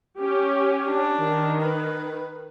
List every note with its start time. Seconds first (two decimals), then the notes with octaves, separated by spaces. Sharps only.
0.19 C#4 G4
0.89 D4
1.19 D#3
1.62 B4